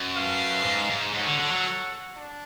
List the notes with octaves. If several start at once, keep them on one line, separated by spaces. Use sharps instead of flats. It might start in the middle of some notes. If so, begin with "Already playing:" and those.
Already playing: F#2
A3 F4 B4 F5
G#2
G#2
G#2 F#4 A4 C#5 F#5
D3
D3
F#3
D4